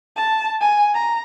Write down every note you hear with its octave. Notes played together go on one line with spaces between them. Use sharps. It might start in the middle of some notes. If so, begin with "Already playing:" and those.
A5
G#5
A#5